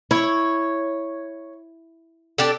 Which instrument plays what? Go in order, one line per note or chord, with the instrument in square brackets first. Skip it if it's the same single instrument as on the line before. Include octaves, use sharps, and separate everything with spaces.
[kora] E4 [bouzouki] C#5
[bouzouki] D4 G4 A4